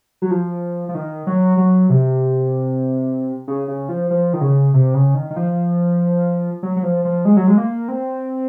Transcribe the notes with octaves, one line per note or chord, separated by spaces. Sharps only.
F#3
F3
F3
D#3
F#3
F#3
C3
C#3
C#3
F3
F3
D#3
C#3
C3
C#3
D#3
D#3
F3
F#3
F#3
F3
F3
G#3
F#3
G#3
A#3
C4